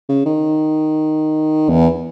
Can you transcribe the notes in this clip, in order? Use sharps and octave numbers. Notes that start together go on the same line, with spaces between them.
C#3
D#3
E2